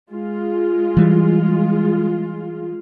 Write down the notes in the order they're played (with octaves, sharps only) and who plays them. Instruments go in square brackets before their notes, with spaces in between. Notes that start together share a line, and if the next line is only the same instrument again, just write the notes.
[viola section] G#3 F4
[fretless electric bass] E3 G3